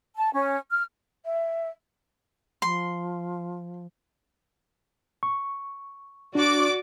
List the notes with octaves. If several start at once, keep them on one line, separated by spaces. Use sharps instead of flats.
A5
C#4
F6
E5
F3 C6
C#6
D4 F#4 D5 D6